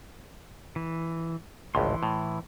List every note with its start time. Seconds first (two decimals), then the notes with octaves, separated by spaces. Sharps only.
0.76 E3
1.75 G#1 C#2 A2 E3 C6
2.03 A2